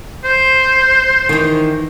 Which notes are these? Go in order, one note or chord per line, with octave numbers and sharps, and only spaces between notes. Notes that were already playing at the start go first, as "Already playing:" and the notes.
C5
D#3 E3